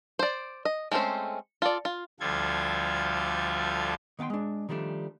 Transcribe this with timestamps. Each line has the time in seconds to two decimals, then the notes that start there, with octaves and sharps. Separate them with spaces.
0.19 C5 D5
0.65 D#5
0.92 G#3 A3 C4 C#4 C5
1.62 F4 A4 D5
1.85 F4
2.20 D2 F3 G3 F4 A4 G#6
4.19 D#3 B3 F5 G5 C6
4.30 G#3 D4
4.69 D#3 F3 G3 A3 D4